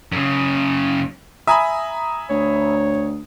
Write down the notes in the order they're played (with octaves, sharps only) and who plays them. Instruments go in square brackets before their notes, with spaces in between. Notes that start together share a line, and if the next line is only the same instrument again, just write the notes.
[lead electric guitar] F#2 C#3
[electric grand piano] E5 G#5 B5 [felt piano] A#5 D#6
[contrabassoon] D2 [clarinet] C#5